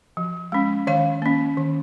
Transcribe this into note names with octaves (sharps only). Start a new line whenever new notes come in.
F3
G#3 C#4
D#3 C#5 F5
A#3 C#4
D#3